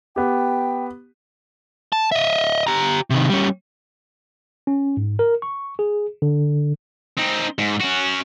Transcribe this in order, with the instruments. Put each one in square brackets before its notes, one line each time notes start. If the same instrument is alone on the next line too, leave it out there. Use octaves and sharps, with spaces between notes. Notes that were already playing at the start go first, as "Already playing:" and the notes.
[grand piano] B3 G4 [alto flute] G5
[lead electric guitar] A5
D#5 E5
G4 A#5
C3 D#3
G3 C#4
[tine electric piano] C#4
G#2
A#4
C#6
G#4
D3
[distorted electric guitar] C4 D#4
G#2
C#4 F#4